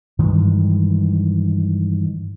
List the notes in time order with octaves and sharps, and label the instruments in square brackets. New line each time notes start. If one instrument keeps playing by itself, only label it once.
[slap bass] G2 D#3 E3 G#3